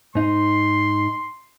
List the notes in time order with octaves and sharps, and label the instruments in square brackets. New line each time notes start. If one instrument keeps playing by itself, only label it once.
[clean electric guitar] G#2 D#4 [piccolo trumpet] C6